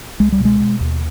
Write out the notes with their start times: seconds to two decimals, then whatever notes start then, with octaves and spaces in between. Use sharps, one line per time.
0.20 C#2 G#3
0.32 G3
0.40 B2
0.45 G#3
0.60 B2
0.81 D#2